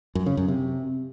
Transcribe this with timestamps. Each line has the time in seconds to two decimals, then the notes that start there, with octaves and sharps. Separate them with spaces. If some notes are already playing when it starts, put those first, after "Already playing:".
0.15 F#2
0.26 C#3
0.37 F#2
0.48 C3